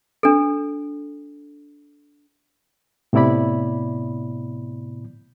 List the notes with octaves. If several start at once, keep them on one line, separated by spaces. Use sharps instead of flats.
D4 A4
A2 C3 B3 E4 D5 B5